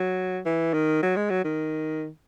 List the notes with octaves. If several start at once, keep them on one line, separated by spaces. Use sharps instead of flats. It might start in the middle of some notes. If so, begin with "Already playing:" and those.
Already playing: F#3
E3
D#3
F#3
G#3
F#3
D#3